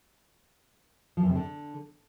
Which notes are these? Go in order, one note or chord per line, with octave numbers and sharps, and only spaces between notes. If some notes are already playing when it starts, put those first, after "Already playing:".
F3
E2
C3
D3